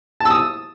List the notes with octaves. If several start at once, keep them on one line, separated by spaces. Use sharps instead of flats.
A5 D#6 E6